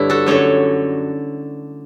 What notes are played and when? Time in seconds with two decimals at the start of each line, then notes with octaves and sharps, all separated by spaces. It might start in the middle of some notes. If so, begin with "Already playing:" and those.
Already playing: G2 D3 A3 D4 E4 C#5
0.10 F#4 A4
0.26 F#2 D3 A3 A4 C#5